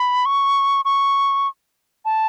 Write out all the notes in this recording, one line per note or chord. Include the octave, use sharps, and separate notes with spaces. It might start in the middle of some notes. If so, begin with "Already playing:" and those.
Already playing: B5
C#6
C#6
A5